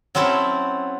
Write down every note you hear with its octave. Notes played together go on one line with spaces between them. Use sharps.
F#3 C4 C#4 E4 A4